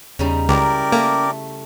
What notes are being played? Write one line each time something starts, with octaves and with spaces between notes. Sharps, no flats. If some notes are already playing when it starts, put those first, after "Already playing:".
E2 C#3 G3 D#4
C#2 C#4 E4 G4 A#4 D5 A#5
A3 A#3